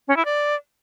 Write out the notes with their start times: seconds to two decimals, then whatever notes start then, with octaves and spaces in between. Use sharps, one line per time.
0.08 C#4
0.16 E4
0.25 D5